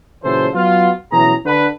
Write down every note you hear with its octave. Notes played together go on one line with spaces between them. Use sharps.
A#2 C#3 E3 F#3 A4 C5
F#3 B3 F4
B2 E3 F#3 C#4 G#4 A#5
D3 B4